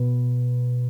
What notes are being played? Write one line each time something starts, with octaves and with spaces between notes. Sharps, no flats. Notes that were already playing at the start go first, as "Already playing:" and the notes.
Already playing: B2